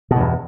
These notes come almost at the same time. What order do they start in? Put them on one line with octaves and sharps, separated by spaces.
B2 G2 E2